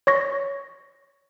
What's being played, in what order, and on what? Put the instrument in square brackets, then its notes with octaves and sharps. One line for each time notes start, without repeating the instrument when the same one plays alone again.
[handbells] C#5 C#6 A#6